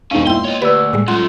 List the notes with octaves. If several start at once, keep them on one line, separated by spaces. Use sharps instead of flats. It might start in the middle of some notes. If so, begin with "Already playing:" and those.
E1 C#4 D#4 C5 F5 D#7
A#2 E4 G5 C6
C#5 D#5
D2 G4 B4 D5 E6
A2 G3 G#3
F#2 A3 F4 F#5 C6